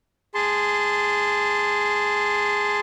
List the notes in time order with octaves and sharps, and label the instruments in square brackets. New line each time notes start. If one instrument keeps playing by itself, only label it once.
[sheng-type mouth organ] G#4 A5 C6